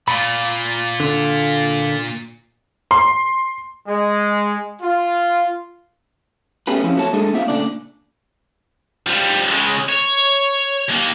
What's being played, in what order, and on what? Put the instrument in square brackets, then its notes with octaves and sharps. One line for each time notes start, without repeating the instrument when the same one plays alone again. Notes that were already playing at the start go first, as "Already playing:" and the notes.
[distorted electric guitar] A#2 [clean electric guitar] B5
[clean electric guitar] D3
[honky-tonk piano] C6
[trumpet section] G#3
F4
[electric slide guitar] A3 B3 C#4 G4 G#4 B4
F3 C4 C#4 E4
A3 A#3 F#4 A#4 C#5 A5
G#3 A3 D4 G#4 A4
A#3 C4 F4 E5
A#2 C#3 A3 D4 D5
[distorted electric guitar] F3 G3
C#3 G#3
C#5
D#2 A#3